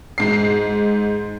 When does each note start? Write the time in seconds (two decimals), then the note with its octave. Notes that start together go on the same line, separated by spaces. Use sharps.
0.18 G#2 C7